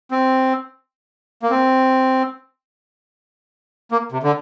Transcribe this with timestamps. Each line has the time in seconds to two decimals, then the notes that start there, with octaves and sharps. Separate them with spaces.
0.11 C4
1.43 A#3
1.50 C4
3.91 A#3
4.12 C3
4.23 D3